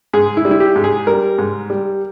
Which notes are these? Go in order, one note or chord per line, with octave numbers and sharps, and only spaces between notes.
G#2 G#4
E4
G3
E4
G4
G#2
G#4
G3 A#4
G#2
G3